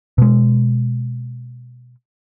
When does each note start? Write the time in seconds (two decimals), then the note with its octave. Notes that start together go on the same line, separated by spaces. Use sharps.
0.18 B2 G#3